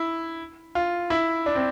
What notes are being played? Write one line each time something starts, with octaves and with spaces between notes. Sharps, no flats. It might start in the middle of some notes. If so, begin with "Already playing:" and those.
Already playing: E4
F4
E4
D4
C4